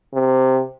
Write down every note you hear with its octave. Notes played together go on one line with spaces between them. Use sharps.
C3